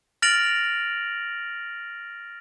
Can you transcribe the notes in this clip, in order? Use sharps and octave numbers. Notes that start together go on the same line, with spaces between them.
F6 A6 A#6 D7 F7 F#7